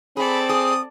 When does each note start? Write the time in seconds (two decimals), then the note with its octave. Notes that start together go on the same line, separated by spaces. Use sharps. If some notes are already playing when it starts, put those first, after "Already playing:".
0.17 C4 G#4 A4 D5 B5
0.49 G#4 D#6